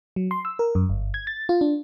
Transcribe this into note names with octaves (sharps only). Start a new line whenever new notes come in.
F#3
C6
E6
A#4
F#2
G1
G#6
A6
F4
D4